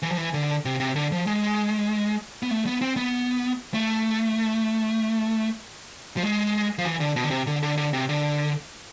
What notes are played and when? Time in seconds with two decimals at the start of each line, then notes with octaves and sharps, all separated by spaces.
0.02 E3
0.11 F3
0.17 E3
0.34 D3
0.65 C3
0.80 C3
0.96 D3
1.12 F3
1.27 G#3
2.43 B3
2.51 A3
2.66 B3
2.81 C4
2.97 B3
3.74 A3
6.17 F3
6.23 G#3
6.78 F3
6.85 E3
7.00 D3
7.16 B2
7.24 D3
7.30 C3
7.47 D3
7.63 D3
7.77 D3
7.93 C3
8.09 D3